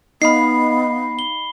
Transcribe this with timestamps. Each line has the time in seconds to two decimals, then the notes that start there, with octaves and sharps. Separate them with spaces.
0.22 B3 D#4 D#5 F5 B5 C7
1.19 G7